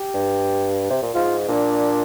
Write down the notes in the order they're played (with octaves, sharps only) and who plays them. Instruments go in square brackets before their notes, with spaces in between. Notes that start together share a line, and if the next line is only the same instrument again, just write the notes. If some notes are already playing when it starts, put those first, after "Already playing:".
Already playing: [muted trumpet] G4
[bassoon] G2
C3
A#2
[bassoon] G#2 [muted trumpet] F4
[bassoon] A#2 [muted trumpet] D4